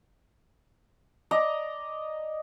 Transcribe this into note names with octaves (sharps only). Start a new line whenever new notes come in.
D5 D#5 A#5